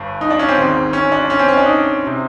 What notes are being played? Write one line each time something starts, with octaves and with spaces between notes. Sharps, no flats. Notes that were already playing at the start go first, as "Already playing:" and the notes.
Already playing: G1 G2
D#4
D4
C#4
C4
G#1 G#2 D#3
C#4
D4
C#4
C4
C#4
D4
D#4
C3